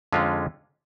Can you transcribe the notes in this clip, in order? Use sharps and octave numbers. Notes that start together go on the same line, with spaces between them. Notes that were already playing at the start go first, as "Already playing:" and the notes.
F2 D3 G#3 C#4 F4